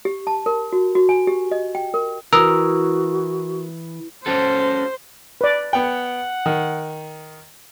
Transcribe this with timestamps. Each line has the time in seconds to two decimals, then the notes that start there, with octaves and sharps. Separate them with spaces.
0.05 G4
0.27 A5
0.46 A#4
0.73 F#4
0.95 F#4
1.09 G#5
1.27 G4
1.51 D#5
1.75 G5
1.94 A#4
2.33 E3 F#4 A#4 D#6 E6
4.26 C#4 F#4 A4 C5
5.41 B4 D5
5.73 B3 F#5 G5
6.46 D#3